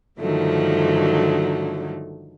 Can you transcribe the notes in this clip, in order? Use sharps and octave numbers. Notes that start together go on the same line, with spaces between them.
G2 D3 D#3 F3 F#3 A3